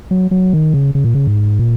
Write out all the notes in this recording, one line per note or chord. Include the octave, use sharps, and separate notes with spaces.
F#3
F#3
D#3
C#3
C#3
A#2
C#3
G#2
A#2